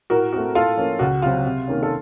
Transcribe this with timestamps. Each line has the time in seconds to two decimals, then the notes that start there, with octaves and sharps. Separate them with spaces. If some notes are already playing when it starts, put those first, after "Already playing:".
0.10 A2 F#4 A#4
0.33 A3 C4 F#4
0.55 A2 F4 A4
0.77 F3 A#3 C#4
0.99 C#2 F#4
1.22 C3 F#3 C4 F4
1.44 C3
1.68 D#3 A#3 C#4
1.83 A4